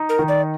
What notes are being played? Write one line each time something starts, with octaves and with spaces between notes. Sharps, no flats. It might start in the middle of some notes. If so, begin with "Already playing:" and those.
Already playing: D#4
A#4
D#3
D5